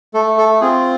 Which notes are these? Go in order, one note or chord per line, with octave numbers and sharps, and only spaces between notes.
A3 A4
A4
C4 F4 G#4